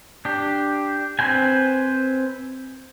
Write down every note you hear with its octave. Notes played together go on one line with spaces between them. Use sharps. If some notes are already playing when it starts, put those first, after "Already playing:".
D4 G4
C4 B4 C5 G5 G#5